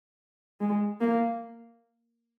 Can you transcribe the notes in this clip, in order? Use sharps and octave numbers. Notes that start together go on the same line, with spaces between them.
G#3
A#3